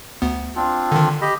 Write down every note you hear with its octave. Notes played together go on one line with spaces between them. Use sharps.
D2 B3
C4 D4 F4
D3 D#3
G4 D#5 B5